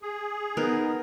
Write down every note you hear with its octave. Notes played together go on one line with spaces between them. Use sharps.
G#4
B3 D#4 A#4